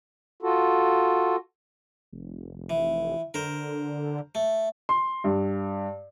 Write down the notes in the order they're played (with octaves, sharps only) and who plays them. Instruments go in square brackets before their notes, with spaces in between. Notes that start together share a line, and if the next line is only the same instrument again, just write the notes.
[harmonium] F4 F#4 A4
[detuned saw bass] F1
[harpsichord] E3
[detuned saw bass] D3 [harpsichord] A#4 C5
[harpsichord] A3
[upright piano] C6
G2